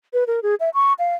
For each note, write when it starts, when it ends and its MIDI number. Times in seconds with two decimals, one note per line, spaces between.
0.13 0.24 71
0.27 0.40 70
0.43 0.55 68
0.60 0.69 76
0.74 0.93 85
0.99 1.15 77